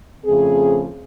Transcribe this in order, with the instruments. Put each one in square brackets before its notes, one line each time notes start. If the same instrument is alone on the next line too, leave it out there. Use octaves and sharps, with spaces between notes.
[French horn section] F2 C#3 F3 A3 C4 G#4